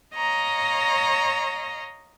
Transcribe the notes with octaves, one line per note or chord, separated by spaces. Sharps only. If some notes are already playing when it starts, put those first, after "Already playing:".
C#5 D#5 F5 A#5